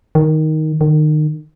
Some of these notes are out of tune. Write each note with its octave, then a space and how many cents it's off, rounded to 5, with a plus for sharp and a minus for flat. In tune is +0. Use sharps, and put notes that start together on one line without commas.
D#3 +5
D#3 -30